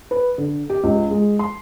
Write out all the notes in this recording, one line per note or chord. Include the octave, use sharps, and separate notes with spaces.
B4
D3
G4
C#2
G#3
C6